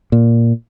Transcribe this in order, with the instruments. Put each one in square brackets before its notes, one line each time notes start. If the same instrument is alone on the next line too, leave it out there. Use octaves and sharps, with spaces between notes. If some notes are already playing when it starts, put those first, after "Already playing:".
[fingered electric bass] A#2